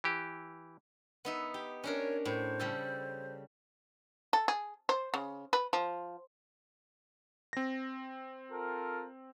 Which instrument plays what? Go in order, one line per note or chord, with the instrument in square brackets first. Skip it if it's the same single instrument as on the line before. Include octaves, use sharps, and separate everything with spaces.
[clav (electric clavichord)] E3 G4
[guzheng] B3 D#4 E5
G4
[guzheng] C#4 D4 A#4 [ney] C#5
[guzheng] A2 [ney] C5
[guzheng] C#3 G3 A4
[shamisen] A4
G#4
C5
C#3
B4
F3
[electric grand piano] C4 A#6
[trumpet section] F4 A4 A#4